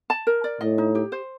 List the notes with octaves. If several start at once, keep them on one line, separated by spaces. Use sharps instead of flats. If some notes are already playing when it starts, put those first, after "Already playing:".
A5
A#4
D5
A2 D#5
D#4
G4
C5